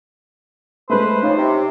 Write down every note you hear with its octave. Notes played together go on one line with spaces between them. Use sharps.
G#3 A3 B4 C5
C#3 F3 D#4
C3